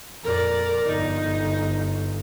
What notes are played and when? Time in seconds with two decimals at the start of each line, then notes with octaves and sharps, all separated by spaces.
0.24 F2 A#2 A#4 D5
0.87 G1 D#4